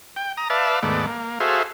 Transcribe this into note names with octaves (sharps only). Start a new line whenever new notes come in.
G5
A#5 D#6
B4 D5 E5 F5 A5
D#2 G#2 A3 B3 D5
A#3
F#4 G#4 A4 C5 E5 F5